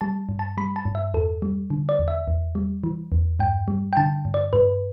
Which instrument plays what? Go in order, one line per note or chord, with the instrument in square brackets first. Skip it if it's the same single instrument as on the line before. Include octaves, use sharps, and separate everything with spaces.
[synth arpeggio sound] G3 A5
G2
A5
G3 B5
A5
G2
E5
E2 A4
G3
D3
D5
E2
E5
E2
G3
E3
E2
G2 G5
G3
G5
D3 A5
G2
D5
G2 B4